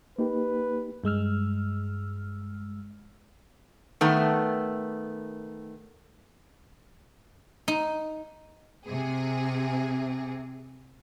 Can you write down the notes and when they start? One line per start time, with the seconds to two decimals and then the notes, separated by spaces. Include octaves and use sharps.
0.18 A#3 D#4 G4 B4
1.04 G2 G#3 E6 F6
4.01 D#3 A3 B3
7.68 D#4
8.88 C3 G#4